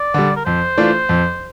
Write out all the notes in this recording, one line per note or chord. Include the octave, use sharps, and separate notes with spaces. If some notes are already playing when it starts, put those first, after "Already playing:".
Already playing: D5
D3 G3
A#4
F2 C5
E3 A3 D4 F4
F2